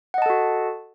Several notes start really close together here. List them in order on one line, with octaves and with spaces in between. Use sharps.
F#5 D#5 A5 A4 F#4